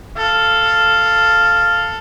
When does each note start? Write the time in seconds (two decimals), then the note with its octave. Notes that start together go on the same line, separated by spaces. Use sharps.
0.17 A4 F5